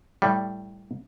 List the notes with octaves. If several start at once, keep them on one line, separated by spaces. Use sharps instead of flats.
A2 G3